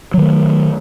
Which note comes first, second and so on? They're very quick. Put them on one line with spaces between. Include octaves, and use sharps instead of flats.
F#3 D#3 A3